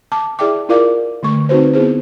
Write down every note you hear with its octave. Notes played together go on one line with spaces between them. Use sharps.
A5 D6
E4 G#4 D5 E5 G5 D6
E4 F4 A#4 D5 F5 D6
D3 A3 C#6
C4 D#4 F#4 B4 C5
B3 E4 G#4 C5